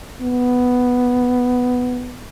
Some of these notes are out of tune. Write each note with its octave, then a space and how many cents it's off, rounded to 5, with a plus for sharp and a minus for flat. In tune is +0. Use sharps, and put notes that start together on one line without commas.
B3 +5